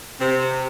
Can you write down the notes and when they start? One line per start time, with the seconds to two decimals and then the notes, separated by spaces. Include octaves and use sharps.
0.20 C3